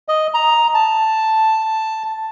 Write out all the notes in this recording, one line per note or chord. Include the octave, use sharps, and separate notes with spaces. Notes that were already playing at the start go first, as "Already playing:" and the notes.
D#5
A#5
A5